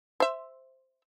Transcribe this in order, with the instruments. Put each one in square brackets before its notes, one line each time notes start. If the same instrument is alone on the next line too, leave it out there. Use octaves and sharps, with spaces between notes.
[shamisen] C5 E5